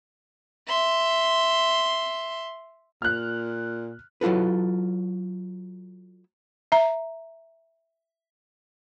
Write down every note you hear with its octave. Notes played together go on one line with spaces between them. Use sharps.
E5 C6
A#2 F6 F#6
F#3 E4 F4 A4 B4
E5 A#5